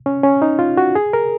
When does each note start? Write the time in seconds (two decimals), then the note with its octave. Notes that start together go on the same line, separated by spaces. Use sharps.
0.06 C#4
0.23 C#4
0.42 D#4
0.59 F4
0.77 F#4
0.95 G#4
1.13 A#4